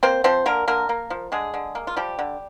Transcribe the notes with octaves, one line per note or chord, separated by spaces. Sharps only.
A#3 C4 C5
F3 C4 C5
D3 A#3 A#4
D3 A#3 A#4
A#3
F3
D3 G#3 G#4
D3
A#3
F4
F3 G3 G4
D3